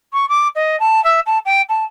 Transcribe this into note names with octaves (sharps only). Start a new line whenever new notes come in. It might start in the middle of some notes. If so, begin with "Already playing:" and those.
C#6
D6
D#5
A5
E5
A5
G5
A5